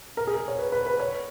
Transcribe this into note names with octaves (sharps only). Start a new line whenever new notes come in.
A#4
G#4
C#5
B4
B4
B4
C#5